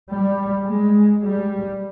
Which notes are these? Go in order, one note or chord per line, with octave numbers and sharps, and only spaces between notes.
G3
G#3
G3